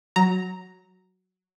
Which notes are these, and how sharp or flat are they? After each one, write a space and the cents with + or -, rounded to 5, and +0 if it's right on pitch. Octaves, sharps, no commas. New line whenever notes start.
F#3 +0 A#5 +0